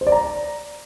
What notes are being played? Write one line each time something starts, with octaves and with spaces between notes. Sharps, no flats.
C5
D5
A#5